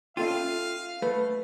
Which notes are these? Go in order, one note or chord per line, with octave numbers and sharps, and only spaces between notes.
C#4 F4 A4 E5 F5 G5 D#7
A3 B4